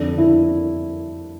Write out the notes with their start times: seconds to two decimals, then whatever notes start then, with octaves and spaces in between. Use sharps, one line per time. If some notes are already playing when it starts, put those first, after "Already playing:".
Already playing: F2 D3 D4
0.18 E4